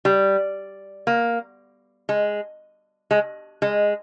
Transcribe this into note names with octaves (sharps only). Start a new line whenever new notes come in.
G3
A#3
G#3
G#3
G#3